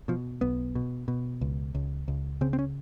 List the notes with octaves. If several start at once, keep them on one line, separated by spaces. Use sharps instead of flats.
B2 F3
B1 B3
B2
B2
C#2
C#2
C#2
C#3 C4
C4
C#4